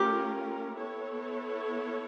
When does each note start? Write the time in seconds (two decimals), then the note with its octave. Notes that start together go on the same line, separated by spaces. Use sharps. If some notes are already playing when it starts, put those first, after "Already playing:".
Already playing: A3 C#4 F4 G4 A#4
0.77 B3 E4 A4 C#5